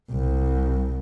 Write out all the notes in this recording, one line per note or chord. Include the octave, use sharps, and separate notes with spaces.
C2